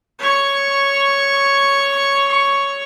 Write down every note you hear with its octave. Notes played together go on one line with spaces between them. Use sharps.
C#5 C#6